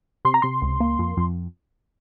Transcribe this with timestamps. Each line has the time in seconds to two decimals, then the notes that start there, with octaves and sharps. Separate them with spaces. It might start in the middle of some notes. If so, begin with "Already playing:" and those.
0.25 C3 C6
0.34 A#5
0.42 C3 C6
0.62 C#2
0.80 A#3
0.99 F2
1.17 F2